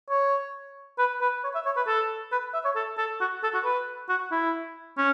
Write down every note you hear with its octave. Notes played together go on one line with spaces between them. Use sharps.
C#5
B4
B4
C#5
E5
C#5
B4
A4
B4
E5
C#5
A4
A4
F#4
A4
F#4
B4
F#4
E4
C#4